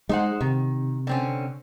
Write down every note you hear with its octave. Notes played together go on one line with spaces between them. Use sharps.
G#3 D#4 C5 F#5
C3 D#3
D3 C4 C#4